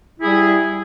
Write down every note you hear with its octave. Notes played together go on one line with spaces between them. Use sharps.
G3 E4 G#4